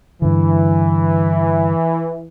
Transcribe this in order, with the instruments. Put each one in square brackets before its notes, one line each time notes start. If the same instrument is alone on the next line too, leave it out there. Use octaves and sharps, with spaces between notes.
[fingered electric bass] G2 D3 [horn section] E3